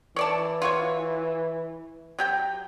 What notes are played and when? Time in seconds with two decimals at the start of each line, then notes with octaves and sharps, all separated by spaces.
0.16 E3 C#5 D5 A5
0.62 F4 F#4 C#5
2.19 F#3 G4 G5